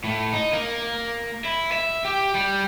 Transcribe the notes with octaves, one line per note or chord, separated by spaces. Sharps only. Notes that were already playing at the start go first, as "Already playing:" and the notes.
A2
D#4
A#3
E4
E5
G4
G3